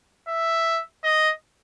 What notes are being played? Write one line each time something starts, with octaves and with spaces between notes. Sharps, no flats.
E5
D#5